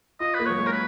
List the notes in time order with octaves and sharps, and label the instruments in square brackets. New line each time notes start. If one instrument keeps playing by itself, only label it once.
[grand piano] F4 [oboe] D#5
[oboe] B4
[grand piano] A#3
[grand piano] F#3 [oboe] C#5
[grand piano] G#3
[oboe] A#4
B4